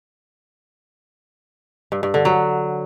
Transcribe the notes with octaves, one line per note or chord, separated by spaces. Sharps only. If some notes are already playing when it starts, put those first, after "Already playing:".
G2
G2
D3
F#3